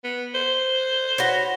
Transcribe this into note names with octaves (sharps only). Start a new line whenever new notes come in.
B3
C5
F#4 B4 C#5